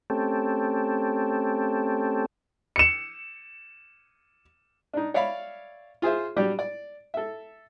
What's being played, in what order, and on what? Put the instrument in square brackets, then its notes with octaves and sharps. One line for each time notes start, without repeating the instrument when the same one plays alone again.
[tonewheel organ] A3 C4 C#4 G4 A4
[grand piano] C#7 E7
[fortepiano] D4 D#4
C#5 D5 E5 F5 B5
F4 G#4 C5 E5
F#3 G3 D4 G4
D5
A4 E5